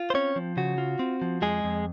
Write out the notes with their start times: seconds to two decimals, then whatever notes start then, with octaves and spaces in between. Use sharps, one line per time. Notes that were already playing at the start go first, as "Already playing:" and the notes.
Already playing: F4
0.10 C5
0.14 C4 C#4 C#5
0.36 F3
0.57 C#3 F#4
0.78 F4
0.99 C4
1.22 F3
1.42 F2 G#3 G#4
1.64 F2